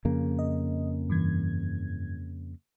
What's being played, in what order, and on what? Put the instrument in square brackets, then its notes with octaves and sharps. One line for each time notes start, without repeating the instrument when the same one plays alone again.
[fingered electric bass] F2 C#3 A#3
[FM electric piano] D#5
G2 E3 G#6